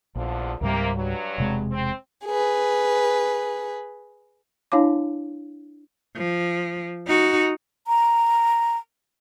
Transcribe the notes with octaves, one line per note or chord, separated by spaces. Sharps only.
A#1 E2 D3 F3
C#2 G#2 C3 G3 A#3
G2 F#3
E1 C3 G#3
C4
G#4 B4
D4 E4 C#5 F5 A5 D6
F3
D#4 F#4
A#5